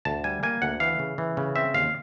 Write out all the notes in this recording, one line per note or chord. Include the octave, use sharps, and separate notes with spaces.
D2 A5
G3 G#5
A#3 G#5
D2 F#5
E3 F5
C#3
E3
C#3
C4 E5
D#2 F5